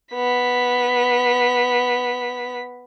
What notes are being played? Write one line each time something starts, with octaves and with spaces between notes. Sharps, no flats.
B3 B6